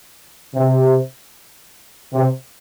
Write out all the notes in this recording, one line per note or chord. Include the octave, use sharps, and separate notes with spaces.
C3
C3